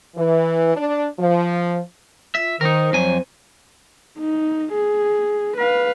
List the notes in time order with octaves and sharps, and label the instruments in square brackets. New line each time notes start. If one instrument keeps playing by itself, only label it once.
[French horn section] E3
D4
F3
[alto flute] F4 [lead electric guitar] E5
[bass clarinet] D#3 [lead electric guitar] D#4 A#4 [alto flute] C5
[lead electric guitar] F2 G#5 [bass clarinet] F#3
[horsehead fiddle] D#4
G#4
B4 F5